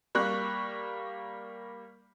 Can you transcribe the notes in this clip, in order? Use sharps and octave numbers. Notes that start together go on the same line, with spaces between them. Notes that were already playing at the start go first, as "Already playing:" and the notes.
G3 A#3 C#6 F#6